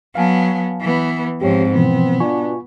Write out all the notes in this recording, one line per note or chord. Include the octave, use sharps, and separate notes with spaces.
F#3 B3 F5 G#5 A5
E3 B3
G#2 F3 C4 G4 C#5
B2 E3 F3 B3
B2 D4 F4 G#5 C#6